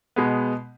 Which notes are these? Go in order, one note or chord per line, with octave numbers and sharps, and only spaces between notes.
B2 G#3 B3